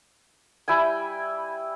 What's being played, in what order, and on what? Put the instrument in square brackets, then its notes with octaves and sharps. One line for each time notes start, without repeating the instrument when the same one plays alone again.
[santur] G3 E4 G5 G#5